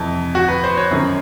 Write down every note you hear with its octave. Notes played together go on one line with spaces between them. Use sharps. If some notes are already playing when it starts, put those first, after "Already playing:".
Already playing: F2 C3 E3
F#4
B4
C5
C#5
F#2 D#3